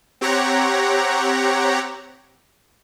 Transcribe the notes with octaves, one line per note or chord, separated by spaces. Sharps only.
C4 G4 C#5 F#5 A#5